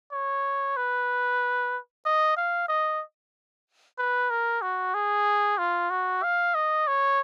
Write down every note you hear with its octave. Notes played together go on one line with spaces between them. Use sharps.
C#5
B4
D#5
F5
D#5
B4
A#4
F#4
G#4
F4
F#4
F5
D#5
C#5